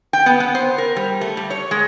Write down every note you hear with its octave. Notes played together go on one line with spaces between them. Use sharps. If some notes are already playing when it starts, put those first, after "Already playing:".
G5
B3
B3
C5
A#4
G3
A3
G3
C#5
G#3